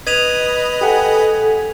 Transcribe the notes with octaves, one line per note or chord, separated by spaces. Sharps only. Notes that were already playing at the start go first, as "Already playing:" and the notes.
B4 D#5 B5 G#6 D#7 F7
G4 A4 F#5 G#5